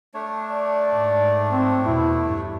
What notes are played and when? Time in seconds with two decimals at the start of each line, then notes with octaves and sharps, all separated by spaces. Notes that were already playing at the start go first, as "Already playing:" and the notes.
0.14 A3 D4 C#5
0.51 D5
0.91 G#2
1.51 C4
1.86 E2 B2 E4
2.24 G2